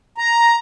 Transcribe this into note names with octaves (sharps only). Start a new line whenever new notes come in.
A#5